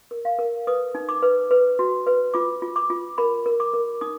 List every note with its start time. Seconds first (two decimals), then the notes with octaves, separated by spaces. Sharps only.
0.11 A#4
0.25 F5
0.39 A#4
0.67 B4 D#6
0.95 D#4
1.09 D6
1.23 B4
1.51 B4
1.79 F#4
2.07 B4
2.34 F4 D6
2.62 F4
2.76 D6
2.90 F4
3.18 A#4 B5
3.46 A#4
3.60 D6
3.74 A#4
4.01 D#4 D#6